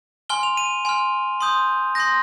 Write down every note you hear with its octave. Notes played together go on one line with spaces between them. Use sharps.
G#5 C6 F6 G7
F7
D#7
G#5 C6 F6
C6 D#6 G6
C6 D#6 G6 A#6